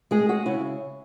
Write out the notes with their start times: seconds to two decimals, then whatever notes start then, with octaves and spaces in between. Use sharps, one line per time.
0.11 G#3 G#4
0.29 F#4
0.46 C#3 E4